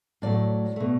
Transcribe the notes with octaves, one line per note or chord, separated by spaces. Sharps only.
A2 F#3 A3 D5
B2 A3